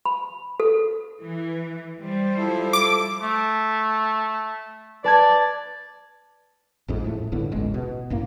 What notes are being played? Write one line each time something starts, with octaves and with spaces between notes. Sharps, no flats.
B5
A4
E3
G3 C5
F3 E4 A4
D6
A3
B4 D5 A5 G#6
A1 F2 G#2
D#1 A2 A3
G1 A2 D3 B3
D#1 A1 G#3
B2
G1 F#2 A2 A#3